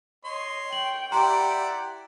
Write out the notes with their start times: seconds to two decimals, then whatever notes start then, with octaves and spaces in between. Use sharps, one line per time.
0.25 C#5 D#5 C6
0.73 G5 F#7
1.12 E4 G4 D5 F#5 G5 A#5 C6